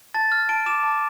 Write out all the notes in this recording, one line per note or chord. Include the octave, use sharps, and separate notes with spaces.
A5 A6
F6
A5 D7
D6 E7
A5